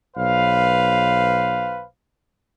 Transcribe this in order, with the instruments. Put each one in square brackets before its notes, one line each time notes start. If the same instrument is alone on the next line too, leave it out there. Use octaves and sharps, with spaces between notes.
[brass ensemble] B1 B4 C5 F5